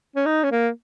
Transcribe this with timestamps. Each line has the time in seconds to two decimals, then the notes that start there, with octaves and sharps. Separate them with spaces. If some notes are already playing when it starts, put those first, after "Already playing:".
0.16 C#4
0.26 D#4
0.44 C#4
0.51 A#3